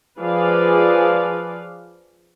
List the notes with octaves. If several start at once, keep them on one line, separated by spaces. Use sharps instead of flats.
F3 G#4 B4 D5 F5